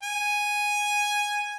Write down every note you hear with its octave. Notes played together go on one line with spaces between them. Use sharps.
G#5